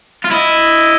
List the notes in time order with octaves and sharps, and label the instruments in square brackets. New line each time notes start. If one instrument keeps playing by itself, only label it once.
[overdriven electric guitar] F4
[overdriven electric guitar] E4 [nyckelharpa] D#5